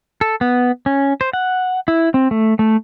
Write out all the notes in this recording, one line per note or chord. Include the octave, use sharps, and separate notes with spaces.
A4
B3
C#4
C5
F#5
E4
C4
A3
A3